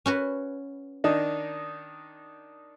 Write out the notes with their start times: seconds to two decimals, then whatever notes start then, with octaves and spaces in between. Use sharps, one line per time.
0.06 C#4 F#4 B4
1.04 D#3 D4 D#4